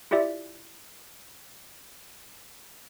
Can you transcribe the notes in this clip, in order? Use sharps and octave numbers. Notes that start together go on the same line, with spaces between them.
E4 F4 G4 D5 E5